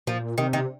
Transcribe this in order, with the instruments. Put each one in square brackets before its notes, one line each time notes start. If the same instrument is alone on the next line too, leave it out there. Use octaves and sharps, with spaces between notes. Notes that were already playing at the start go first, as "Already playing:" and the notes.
[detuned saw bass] A#2 [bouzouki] F3
[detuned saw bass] C3 [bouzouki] D#3
[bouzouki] D#3